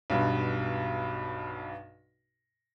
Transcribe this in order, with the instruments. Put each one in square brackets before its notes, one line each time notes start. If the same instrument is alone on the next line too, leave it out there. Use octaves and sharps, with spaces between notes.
[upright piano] B1 G2 B2